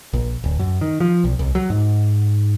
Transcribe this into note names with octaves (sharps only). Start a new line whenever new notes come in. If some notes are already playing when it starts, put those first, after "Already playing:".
A#1
D1
F#2
D#3
F3
B1
C2
F#3
G#2